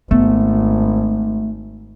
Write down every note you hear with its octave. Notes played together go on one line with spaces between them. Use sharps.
G#1 A3 B3